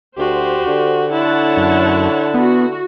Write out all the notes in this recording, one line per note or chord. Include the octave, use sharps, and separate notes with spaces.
D2 F#4 G4 C5
D3
E4 C#5 F#5 A5
F#2
B3 F#4